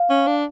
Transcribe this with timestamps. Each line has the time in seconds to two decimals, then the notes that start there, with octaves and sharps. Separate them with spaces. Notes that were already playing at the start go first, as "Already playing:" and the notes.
Already playing: F5
0.10 C#4
0.27 D4